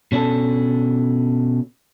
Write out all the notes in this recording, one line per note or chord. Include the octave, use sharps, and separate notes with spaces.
B2 C#4 D4 A4